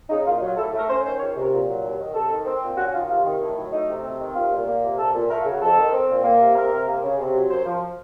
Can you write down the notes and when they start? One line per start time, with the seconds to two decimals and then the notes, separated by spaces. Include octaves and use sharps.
0.10 C#3 D#4
0.26 A#2 F4
0.36 D#4
0.41 F#3
0.46 F4
0.56 A2 A4
0.67 A4
0.72 A3
0.78 A#4
0.88 C#4 C5
1.04 D#3 C5
1.19 C#2 C#5
1.35 C3
1.41 A#4
1.52 A#2
1.67 F#3
1.83 D#2
1.98 D#3
2.14 C3 A4
2.30 D#3
2.45 C4
2.61 A#2
2.77 C#4 F#4
2.93 D#3 F4
3.09 C3 F4
3.24 D#3
3.40 A2
3.56 F#3
3.72 A3 D#4
3.88 C3
4.04 C4
4.19 D#3
4.35 C2 F4
4.51 A#2
4.67 A#3
4.83 C3
4.97 C2 A4
5.14 A#2
5.29 A3 A#4
5.40 F4
5.45 C#3
5.50 F#4
5.61 F2 A4
5.77 D#3
5.92 C4
6.09 A#2
6.24 A#3
6.40 C3
6.56 C4 A#4
6.71 C3
6.87 A#3
7.03 C#3
7.19 C3
7.34 F#3
7.50 F#2 C5
7.65 F3